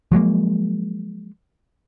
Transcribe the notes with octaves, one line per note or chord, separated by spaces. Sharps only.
F3 F#3 G#3 A#3